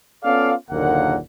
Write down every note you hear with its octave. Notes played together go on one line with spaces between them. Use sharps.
B3 C#4 F4 A4 D5 F5
F#1 D#2 A#2 D3 A#3 F#5